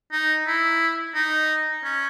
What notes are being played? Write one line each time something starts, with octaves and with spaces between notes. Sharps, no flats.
D#4
E4
D#4
C#4